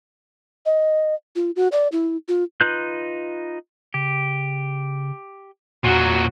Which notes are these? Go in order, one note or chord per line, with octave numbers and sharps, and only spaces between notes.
D#5
F4
F#4
D5
E4
F4
D#4 F4 B4 F#6 G6
C#3 G4
E2 A#2 F#3 F#4